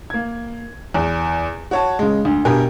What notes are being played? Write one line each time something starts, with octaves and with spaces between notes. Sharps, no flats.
A#3 G#6
E2
F#4 C#5 A5
C#3 G#3
D2
G2 B2 G4 A#4 G#5